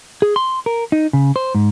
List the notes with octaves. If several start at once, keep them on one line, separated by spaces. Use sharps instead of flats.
G#4
C6
A#4
D#4
C#3
C5
G#2